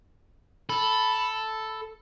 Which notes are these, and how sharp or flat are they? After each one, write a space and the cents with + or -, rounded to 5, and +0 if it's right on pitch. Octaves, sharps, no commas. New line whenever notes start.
A4 +0 B5 +0